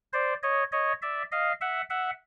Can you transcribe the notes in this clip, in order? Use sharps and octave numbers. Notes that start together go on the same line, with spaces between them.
C5 D5
C#5 D#5
C#5 D#5
D5 E5
D#5 F5
E5 F#5
E5 F#5